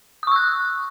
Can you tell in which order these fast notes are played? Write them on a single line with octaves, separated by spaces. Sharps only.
D#6 C#6 E6 F#6